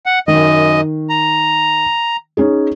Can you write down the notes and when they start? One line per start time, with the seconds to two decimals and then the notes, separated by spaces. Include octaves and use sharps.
0.06 F#5
0.28 F#2 D#3 D#5
1.10 A#5
2.37 C#4 D#4 G#4